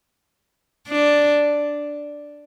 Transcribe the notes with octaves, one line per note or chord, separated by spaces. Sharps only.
D4